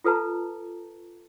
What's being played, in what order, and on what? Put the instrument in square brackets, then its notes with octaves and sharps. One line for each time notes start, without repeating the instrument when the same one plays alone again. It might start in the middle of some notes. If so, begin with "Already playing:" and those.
[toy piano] F4 A4 B4 A5 A#5